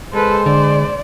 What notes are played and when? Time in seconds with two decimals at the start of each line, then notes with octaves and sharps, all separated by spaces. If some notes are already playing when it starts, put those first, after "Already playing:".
0.14 G#3 A4 B4 C5
0.46 D3 D5